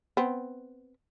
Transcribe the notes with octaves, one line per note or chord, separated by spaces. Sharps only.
B3 C4